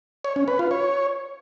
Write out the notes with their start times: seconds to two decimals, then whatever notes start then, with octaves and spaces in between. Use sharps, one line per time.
0.24 C#5
0.36 C#4
0.48 B4
0.59 F4
0.71 C#5